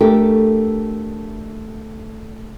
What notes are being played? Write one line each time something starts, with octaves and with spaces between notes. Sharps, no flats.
A3 D4 G4 A4 A#4